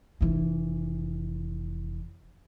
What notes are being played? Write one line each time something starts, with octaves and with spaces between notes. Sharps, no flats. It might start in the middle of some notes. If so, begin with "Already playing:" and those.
F1 E3